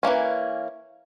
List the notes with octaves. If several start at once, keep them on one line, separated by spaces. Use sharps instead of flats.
E3 F#3 A#3 C#4